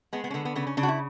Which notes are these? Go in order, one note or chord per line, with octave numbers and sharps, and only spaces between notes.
G#3 B3
B3
C#4
D3 B3
B3
C#3 B3
C#4
C#3 D4
F#4
E4